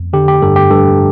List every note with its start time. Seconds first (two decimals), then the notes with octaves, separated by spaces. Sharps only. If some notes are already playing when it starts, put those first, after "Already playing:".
Already playing: F2
0.13 D3 G4
0.28 G4
0.42 G2 A4
0.56 G4
0.70 G2 A4